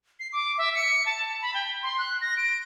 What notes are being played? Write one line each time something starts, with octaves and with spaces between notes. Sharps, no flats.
C7
D6
E5
C#7
A5
B5
G5
C6
F#6
A#6
D7